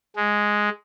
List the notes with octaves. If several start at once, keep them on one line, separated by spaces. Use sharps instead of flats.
G#3